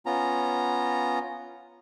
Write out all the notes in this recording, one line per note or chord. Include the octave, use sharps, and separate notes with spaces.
B3 C#4 F4 A#5